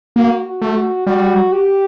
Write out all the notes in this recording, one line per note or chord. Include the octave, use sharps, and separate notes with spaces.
A#3 F#4
F#4
A3
F#4
G3 F#4
G4